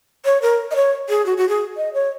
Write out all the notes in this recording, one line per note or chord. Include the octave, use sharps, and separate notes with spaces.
C#5
A#4
D#5
C#5
G#4
F#4
F#4
G#4
D#5
C#5